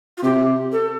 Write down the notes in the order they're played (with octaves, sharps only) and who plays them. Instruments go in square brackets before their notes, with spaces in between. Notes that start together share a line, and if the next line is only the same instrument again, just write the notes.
[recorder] F4
[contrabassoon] C3 [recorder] G4
[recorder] A4